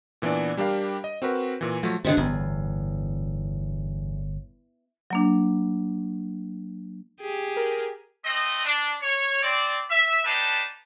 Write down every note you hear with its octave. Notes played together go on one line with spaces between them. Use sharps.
A#2 E3 B3 D4 D5
G3 D4 G4 A#4 F5
D#5
C4 F#4 A#4 B4
A#2 E3
F3 F#3 A3
G2 D3 D#3 F3
G1 E2 A2
F#3 A#3 D4
G4 G#4
A#4
A3 C4 D#5
D4
C#5
C4 D5
E5
D4 D#4 G4 B4 A5